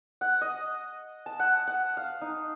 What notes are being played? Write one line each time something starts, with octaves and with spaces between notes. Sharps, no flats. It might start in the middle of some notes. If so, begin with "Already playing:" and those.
F#5
D#5
A5
F#5
F#5
F5
D#4